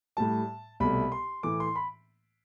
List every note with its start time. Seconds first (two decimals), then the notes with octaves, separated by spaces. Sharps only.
0.17 A2 G3 A5
0.80 C2 B2 A3 B5
1.12 C6
1.43 A2 E3 A3 D6
1.60 C6
1.76 B5